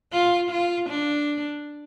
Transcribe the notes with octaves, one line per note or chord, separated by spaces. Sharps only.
F4
F4
D4